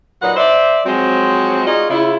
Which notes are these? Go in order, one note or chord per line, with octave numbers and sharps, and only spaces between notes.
A#2 F#3 D#4 B4 F#5
C5 D5 E5
F3 F#3 G#3 C4 F#4
D#4 F4 F#4 G#4 D5 D#5
C#3 E4 F4